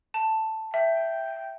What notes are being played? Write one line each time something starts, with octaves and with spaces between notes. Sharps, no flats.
A5
E5 G5